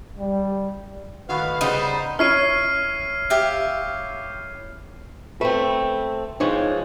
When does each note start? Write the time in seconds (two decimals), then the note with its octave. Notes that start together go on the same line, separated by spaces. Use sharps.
0.18 G3
1.29 A2 D#3 F#4 B4 F5
1.61 C#3 G3 B3 D#4 C5
2.19 C#4 E4 C#5 F6 C7 D#7
3.30 G4 E5 F5
5.41 A3 C4 B4
6.40 E3 F3 G#3 D#4 C#5